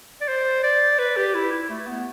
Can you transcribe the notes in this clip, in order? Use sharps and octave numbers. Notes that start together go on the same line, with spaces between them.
D5
C5
D5
B4
G4
E4
E4
A3
B3